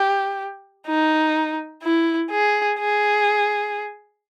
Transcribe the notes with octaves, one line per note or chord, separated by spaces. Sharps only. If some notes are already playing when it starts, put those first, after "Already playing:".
Already playing: G4
D#4
E4
G#4
G#4